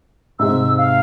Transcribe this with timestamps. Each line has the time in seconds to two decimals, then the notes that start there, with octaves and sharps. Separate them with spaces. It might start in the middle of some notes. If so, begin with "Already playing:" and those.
0.39 G#2 C3 G#3 E6
0.78 F5